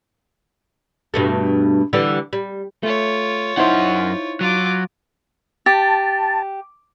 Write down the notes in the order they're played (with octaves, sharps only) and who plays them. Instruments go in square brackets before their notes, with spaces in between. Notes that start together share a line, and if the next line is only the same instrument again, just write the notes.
[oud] G2 B2 A3
D3 E3 G3
G3
[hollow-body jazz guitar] A3 [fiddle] F4 C#5
[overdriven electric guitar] F#2 F#5 [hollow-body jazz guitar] D#4 E4 C5
[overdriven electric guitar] F#3 [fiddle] F4 D6
[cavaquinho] G4 [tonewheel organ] A5